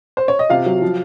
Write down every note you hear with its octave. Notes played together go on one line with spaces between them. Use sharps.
C5
C#5
D#5
C3 F4 F5
F#3
F3